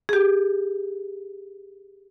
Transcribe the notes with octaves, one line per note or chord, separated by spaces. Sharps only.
G4 G#4